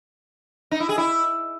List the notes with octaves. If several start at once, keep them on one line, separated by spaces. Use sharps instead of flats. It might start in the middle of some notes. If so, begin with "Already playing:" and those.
D#4
E4
G#4
E4